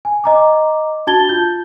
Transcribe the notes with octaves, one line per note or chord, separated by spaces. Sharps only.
G#5
D#5 A#5 D6
D4 F#4 A5 G#6 A6 G7
F4 G6